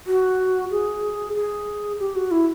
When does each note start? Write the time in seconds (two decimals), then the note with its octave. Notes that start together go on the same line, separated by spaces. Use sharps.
0.07 F#4
0.71 G#4
1.35 G#4
2.00 G4
2.16 F#4
2.31 E4